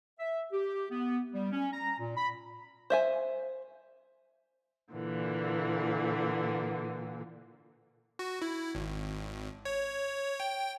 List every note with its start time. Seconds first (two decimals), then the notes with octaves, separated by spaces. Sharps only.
0.20 E5
0.52 G4
0.90 B3
1.33 G3
1.52 C#4
1.72 A#5
1.99 A#2
2.16 B5
2.90 C5 E5 G#5
4.92 A#2 D3 E3 A#3
8.19 F#4
8.42 E4
8.75 G#1
9.65 C#5
10.40 G5